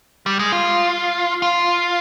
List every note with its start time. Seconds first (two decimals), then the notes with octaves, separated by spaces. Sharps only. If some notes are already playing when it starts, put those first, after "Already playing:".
0.26 G3
0.39 G#3
0.52 F4
1.42 F4